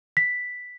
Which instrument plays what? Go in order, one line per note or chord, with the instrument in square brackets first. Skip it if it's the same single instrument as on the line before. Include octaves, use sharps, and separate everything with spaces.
[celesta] B6